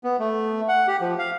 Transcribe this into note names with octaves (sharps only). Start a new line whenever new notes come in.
B3
A3
F#5
G4
F3
F5